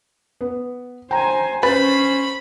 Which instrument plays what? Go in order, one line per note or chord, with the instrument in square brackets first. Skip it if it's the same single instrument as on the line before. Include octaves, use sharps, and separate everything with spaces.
[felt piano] B3
[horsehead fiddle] C5 G#5 [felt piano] G5 A#5
[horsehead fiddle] C#4 C5 [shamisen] B4 [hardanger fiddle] B5 [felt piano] A6